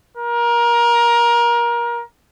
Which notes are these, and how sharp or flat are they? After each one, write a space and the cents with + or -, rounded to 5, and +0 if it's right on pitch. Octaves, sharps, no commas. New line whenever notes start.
A#4 +25